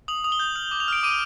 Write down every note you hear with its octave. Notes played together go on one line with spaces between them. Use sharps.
D#6 F#7
D#6
G7
G6
F6 F#7
D6
F7
F6 D7
D6 D#7